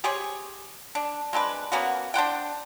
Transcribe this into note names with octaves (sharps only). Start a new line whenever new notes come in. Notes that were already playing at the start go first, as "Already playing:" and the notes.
G4 G#4 C5 C#5
D4
G#3 C4 D4 B4
A#3 B3 C#4 F#4
D4 C5 F#5 G5